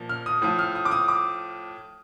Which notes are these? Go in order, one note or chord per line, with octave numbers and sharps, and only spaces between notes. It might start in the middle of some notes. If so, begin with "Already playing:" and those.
Already playing: A#2 F3
F6
D#6
A2 F3 D#6
F6
D#6
D6
D#6
D6